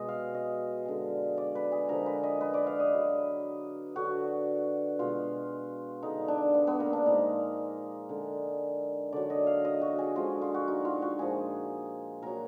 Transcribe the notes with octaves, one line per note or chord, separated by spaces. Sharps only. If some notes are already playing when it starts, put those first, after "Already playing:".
Already playing: B2 G#3 D#5
F5
D#5
D3 G#3
D5
B4
G#4
D3 F3 G#3 A#4
B4
D#5
B4
D5
F5
D#5
D3 F#3
D3 F#3 F#4
B2 G#3 F4
D3 G#3 D#4
D4
B3
B3
A#3
D4
A#2 F3 G#3 D#4
D3 G#3
D3 F#3 D5
D#5
F5
D#5
F#4
G#4
D3 F3 G#3 F4
F4
F#4
D#4
F4
F#4
A#2 F3 G#3 G#4
A#2 F#3 A#4